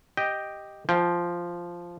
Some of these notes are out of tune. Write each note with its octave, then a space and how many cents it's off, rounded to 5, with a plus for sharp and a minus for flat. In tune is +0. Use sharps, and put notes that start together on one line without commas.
G4 +0 D#5 +0 G5 +0
F3 -5 G5 +10